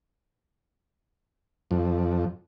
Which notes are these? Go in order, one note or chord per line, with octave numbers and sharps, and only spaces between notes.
F2